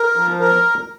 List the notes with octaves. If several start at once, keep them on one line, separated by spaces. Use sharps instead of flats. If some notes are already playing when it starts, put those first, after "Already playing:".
Already playing: A#4
F3
A#4